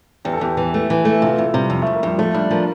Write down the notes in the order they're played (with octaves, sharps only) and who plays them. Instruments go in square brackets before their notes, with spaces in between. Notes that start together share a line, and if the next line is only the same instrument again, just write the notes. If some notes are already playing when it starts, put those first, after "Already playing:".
[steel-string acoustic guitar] E2 [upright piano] G4
[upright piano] A4
[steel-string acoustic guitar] E2 [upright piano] G4
[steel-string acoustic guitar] E3
A3
E3
A3
[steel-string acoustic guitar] C3 [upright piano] F4
[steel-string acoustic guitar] C3 [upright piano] E4
[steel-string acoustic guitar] C3 [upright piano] G3
[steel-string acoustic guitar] F2
[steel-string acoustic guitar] F2 [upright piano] A3
[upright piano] A#3
[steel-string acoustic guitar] F2 [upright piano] G3
[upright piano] F3 [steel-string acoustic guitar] A3
[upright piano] G3 [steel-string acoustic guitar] D4
[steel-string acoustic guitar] F3 [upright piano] A#3